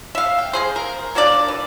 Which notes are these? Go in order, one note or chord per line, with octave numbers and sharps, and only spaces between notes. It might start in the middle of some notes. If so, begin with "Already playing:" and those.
E5 F5
G5
G#3 G#4 C5
A#4
F#3 A#3 D4 D5
E3